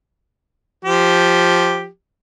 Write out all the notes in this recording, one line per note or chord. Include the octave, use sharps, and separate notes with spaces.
F3 G4